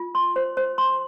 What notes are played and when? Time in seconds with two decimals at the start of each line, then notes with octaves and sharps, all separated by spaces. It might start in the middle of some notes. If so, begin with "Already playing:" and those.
Already playing: F4
0.15 C6
0.36 C5
0.57 C5
0.78 C6